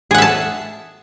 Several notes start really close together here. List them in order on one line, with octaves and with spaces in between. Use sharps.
G#4 F#5 E5 A5